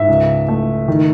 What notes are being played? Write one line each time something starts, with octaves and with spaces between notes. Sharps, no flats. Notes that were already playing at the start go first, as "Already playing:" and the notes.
Already playing: G#2 E5
C#2
A3
D#3